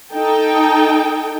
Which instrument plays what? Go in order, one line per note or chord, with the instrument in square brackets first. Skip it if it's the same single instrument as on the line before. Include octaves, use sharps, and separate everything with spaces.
[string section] D#4 A4 G5